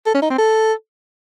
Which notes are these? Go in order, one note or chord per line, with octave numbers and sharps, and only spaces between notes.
A4
C#4
D#4
C4
A4